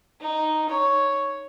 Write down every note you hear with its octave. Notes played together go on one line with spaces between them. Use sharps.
D#4
C#5